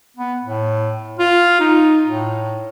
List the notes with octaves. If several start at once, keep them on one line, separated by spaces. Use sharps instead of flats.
B3
A2
F4
D#4
A2